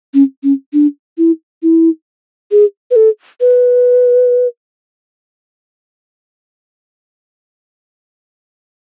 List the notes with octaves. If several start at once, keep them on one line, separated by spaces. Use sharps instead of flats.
C#4
C#4
D4
E4
E4
G#4
B4
A4
B4